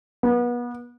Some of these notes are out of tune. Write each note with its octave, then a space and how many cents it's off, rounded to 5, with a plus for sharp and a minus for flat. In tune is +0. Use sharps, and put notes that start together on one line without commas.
B3 -30